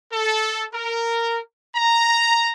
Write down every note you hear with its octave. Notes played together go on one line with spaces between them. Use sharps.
A4
A#4
A#5